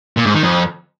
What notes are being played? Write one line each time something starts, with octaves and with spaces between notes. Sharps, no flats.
A#2
G#2
D#3
F2